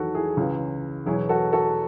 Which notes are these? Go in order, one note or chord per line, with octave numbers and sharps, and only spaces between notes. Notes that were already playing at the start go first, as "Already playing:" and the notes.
Already playing: E2 D#3 F#3 F#4 A4
E4 G#4
C#2 C#3 E3
E2 B2 F#3 E4 G#4
F#4 A4
F#4 A4